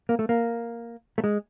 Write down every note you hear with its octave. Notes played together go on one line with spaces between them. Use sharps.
A#3
A3
A#3
A3
G#3